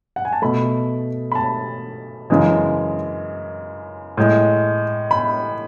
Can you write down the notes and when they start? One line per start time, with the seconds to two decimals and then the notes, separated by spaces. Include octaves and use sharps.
0.16 F#5
0.25 G#5
0.33 A5
0.42 B2 A3 B5
1.32 B5
1.35 A5
2.30 F#2 C#3 E3 G#3
4.17 A2 G#3
5.11 B5